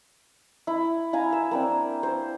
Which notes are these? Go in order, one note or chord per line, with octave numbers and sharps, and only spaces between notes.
E4
E4 F5 G#5 A#5
E6
A#3 C4 D4
C5